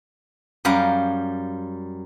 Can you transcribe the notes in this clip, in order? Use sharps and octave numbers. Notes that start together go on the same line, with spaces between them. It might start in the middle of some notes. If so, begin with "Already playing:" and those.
F#2 G3 F5 A#5